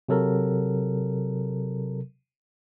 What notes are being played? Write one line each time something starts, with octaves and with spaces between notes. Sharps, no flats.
C3 F#3 A4 A#4